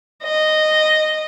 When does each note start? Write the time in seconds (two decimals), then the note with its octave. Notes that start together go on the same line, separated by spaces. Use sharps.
0.25 D#5